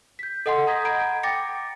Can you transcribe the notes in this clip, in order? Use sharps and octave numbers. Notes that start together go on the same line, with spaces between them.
G6 B6
A4 D#5 F#5 G#5 C6
A#5 D#6 G6 G#6 A#6 B6
F#5 A#5 B5 G6 G#6 D7
G5 D6 A6 A#6 C#7